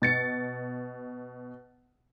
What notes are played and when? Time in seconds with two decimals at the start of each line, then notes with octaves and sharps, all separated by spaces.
0.02 B2 A6 C#7